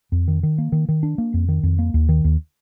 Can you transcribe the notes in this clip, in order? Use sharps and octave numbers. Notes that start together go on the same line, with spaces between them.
F2
D#3
D#3
A#3
D#3
D#3
D4
A#3
F2
D#3
F2
A#3
D#2
D#3
D#2